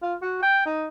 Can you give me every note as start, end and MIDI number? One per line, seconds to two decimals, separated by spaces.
0.02 0.14 65
0.22 0.40 66
0.43 0.62 79
0.66 0.87 63